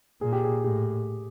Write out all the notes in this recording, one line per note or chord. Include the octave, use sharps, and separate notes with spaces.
A#2 G#4
G4
G#4
A2 G4